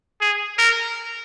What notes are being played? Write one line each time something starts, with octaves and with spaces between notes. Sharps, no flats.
G#4
A#4